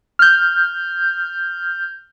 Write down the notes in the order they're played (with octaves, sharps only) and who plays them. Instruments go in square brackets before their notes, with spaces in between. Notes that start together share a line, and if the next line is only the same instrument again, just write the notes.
[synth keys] F6 G6